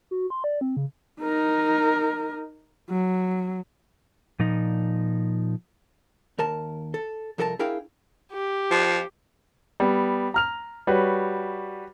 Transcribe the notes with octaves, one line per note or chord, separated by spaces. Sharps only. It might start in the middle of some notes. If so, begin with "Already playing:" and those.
F#4
C6
D5
C4
C#3
D#4 A#4
F#3
A#2 F3 D#4
D#2 A#4 A5
A4
C2 F3 A4 A#4 D#5 A5
D4 E4 G#4 A#4 F5 G5
G4
F3
G3 B3
A#5 F6 F7
G3 F#4 B4 C#5